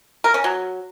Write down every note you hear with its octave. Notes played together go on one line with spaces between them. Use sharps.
A#4
C#4
F#3